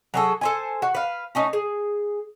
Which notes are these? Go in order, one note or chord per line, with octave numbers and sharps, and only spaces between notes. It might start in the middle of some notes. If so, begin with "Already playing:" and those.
F#3 G#4 A4
A4 C5 G#5
F#4
B4 F5
A3 C#4 D#4
G#4